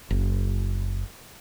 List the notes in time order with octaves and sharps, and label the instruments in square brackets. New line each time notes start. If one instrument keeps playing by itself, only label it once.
[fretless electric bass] F#1